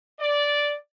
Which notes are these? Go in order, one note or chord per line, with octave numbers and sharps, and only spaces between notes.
D5